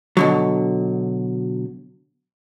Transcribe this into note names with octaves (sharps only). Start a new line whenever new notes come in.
B2 D3 F#3